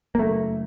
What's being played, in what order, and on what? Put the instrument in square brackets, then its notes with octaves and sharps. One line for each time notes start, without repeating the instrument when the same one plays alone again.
[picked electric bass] A#3
F#1 A3